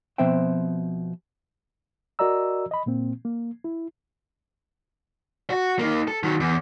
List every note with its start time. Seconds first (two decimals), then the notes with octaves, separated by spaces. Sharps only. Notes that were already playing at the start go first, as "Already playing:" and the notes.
0.18 B2 F3 C4 C5 E5 G5
2.19 F#4 A#4 D5 D#5 A#5 E6
2.71 D#5 B5
2.86 A#2 A#3 C4
3.25 A#3
3.64 E4
5.50 F#4
5.79 A#3 D#4
6.08 A4
6.23 D#3 F#3
6.40 E2